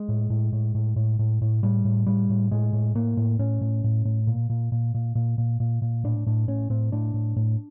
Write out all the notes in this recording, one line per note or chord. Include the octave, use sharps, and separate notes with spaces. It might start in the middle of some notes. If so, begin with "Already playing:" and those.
Already playing: G#3
A2
A2
A2
A2
A2
A2
A2
A2 G3
A2
A2 G3
A2
A2 G#3
A2
A2 A#3
A2
A2 C#4
A2
A2
A2
A#2
A#2
A#2
A#2
A#2
A#2
A#2
A#2
A2 D4
A2 D4
A2 C#4
A2 C4
A2 D4
A2
A2